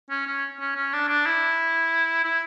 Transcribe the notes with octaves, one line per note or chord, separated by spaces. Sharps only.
C#4
C#4
C#4
C#4
D4
D4
E4
E4